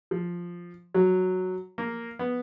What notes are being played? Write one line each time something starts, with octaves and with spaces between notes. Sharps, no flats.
F3
F#3
A#3
B3